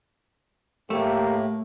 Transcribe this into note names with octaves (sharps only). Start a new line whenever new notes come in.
A2 A3 A#3 G4